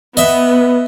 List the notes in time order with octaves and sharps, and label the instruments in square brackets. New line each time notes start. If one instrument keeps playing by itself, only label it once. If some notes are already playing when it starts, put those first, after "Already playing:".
[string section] B3 [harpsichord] D#5 E5